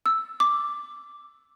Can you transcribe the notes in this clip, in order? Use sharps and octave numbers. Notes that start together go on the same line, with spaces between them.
E6
D6